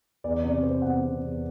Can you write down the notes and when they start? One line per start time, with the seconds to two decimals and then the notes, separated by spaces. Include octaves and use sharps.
0.24 E2 D5
0.44 C3 D5
0.63 C3 C5
0.82 E2 F#5
1.02 C3
1.21 E2